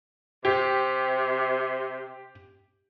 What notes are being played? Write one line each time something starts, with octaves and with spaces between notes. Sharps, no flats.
C3 G4